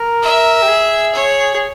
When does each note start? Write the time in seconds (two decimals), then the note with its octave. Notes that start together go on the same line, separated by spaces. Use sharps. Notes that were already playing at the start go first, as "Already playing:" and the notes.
Already playing: A#4
0.22 E5
0.62 G4
0.68 G#4
1.15 C#5
1.55 G#4